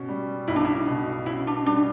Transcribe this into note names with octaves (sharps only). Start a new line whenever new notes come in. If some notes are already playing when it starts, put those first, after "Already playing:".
Already playing: B2 C#4
G3
B1 E4
D4
E4
B2
C#4 E4
D4
G3 D4